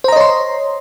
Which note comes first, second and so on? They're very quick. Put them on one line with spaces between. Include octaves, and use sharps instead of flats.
C5 A#5 D#5 C#5 C6